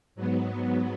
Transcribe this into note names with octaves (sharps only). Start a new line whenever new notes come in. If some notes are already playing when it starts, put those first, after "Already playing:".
G#2 F#3 B3